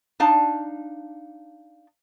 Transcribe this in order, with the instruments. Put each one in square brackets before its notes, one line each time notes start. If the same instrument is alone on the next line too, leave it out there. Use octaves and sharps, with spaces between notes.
[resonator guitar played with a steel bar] D4 D#4 F5 A5